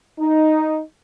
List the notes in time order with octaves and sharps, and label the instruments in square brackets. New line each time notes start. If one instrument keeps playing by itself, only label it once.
[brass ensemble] D#4